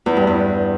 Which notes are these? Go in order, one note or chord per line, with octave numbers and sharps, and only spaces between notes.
E2
G2
E2